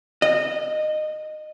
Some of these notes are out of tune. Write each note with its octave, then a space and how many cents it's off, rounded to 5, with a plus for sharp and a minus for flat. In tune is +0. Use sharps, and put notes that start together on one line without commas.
D#5 -20